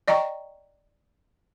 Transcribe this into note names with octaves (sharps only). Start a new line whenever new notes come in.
D5 D#5 G5 A#5 C#6